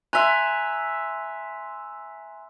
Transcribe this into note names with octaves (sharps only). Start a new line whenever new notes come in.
E5 G#5 A#5 C6 F#6